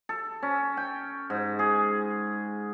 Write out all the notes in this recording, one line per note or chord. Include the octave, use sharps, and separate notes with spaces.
A4
C#4
G5
G#2
G#4